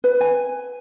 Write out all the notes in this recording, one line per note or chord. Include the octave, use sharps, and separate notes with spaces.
B4
G#5